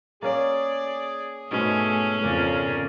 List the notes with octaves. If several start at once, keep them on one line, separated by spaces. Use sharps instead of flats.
A#3 C#4 G#4 D5
G#2 B2 G#3 A3 C#4
F2 C#3 F3 A#4 D5 F#5